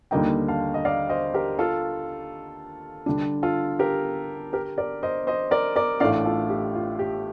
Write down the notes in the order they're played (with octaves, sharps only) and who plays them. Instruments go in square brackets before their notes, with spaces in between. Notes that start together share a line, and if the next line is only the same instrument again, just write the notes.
[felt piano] D#2 D3 G3 A#3 D#4 [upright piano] D#5 G5
[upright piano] F5 A5
D#5
D5 F5
C5 D#5
G4 A#4
F4 A4
[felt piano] D3 G3 D4
[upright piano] F4 A4
G4 A#4
G4 A#4
A#4 D5
C5 D#5
C5 D#5
A#4 D5
A#4 D5
[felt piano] A1 A2 A3 D4 [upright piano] D5 F5
[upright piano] F4 A4
G4
F4
G4